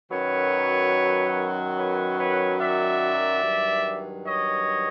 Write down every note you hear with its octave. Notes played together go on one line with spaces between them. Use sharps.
F#2 D#3 F#3 B4 C#5
B4 C#5
B4 C#5
D5 E5
G2 D#3 F#3
C#5 D#5